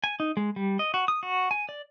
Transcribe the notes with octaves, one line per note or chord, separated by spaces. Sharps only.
G#5
D#4
G#3
G3
D#5
F#4
D#6
F#4
G#5
D5